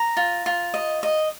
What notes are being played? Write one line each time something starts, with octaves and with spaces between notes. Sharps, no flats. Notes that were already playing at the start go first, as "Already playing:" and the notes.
Already playing: A#5
F4
F4
D#5
D#5